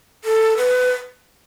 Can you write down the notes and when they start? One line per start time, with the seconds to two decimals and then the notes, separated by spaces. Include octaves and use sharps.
0.24 A4
0.57 B4